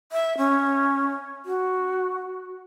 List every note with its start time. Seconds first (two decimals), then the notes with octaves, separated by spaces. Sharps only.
0.12 E5
0.38 C#4
1.45 F#4